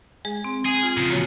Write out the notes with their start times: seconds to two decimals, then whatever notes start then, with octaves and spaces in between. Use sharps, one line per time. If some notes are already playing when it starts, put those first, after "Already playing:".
0.25 G#3 G#4
0.44 C4
0.66 G#4
0.83 F4
0.97 C#3 F3
1.10 A#3 F#4 C#5